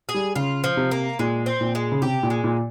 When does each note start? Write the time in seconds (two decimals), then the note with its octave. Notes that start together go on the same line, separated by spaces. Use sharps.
0.09 G#4
0.14 G3
0.35 C#3 F4
0.64 F3
0.77 C3
0.91 A#3
1.19 A#2 G#3
1.46 C4
1.61 A#2
1.75 G#3
1.92 C#3
2.02 C3 G4
2.23 A#2
2.30 G#3
2.44 A#2